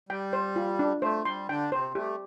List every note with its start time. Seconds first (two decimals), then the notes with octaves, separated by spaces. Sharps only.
0.09 G3 G5
0.33 C5
0.56 F4
0.79 D4
1.02 A3 C5
1.25 G3 C6
1.49 D3 D4 G5
1.72 C3 C4 C5
1.95 A3 G4